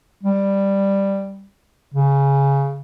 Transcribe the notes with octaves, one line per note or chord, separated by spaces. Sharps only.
G3
C#3